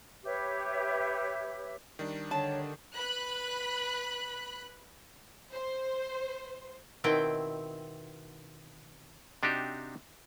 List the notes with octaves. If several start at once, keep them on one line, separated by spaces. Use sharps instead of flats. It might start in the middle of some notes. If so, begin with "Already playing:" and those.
G4 B4 C#5 E5
D#3 G3 D4
D3 C#5 A5
B4 B5 F#6
C5
B2 D#3 C4 E4 G5
C3 D4 D#4 F#4 G4